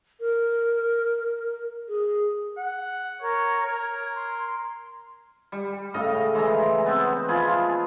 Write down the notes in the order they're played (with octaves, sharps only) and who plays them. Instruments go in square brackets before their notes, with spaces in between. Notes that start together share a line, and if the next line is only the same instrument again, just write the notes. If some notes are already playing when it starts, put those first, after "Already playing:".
[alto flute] A#4
G#4
[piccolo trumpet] F#5
[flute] A#4 [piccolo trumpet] C#5
[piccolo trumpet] A#4 [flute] G#6
[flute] C6
[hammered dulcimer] G3
A2 C#3 D#5 F5
E3 G#3 E5 A#5
B3 C4
F3 F4 G#4 B5